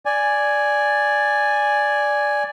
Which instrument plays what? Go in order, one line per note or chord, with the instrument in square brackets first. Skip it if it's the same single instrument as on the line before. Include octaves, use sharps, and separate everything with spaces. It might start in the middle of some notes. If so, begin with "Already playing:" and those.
[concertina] D5 G#5